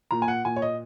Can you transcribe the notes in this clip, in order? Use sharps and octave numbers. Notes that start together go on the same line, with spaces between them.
A#2 A#5
G#5
F#5
A#2 G#5
C#5
D#5